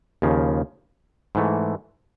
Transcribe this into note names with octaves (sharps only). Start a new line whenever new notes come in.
D#2 C#3 F3
G#2 E3 A3